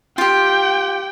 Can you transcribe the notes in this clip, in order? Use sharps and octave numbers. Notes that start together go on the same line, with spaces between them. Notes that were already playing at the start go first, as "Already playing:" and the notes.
F4 G4 G5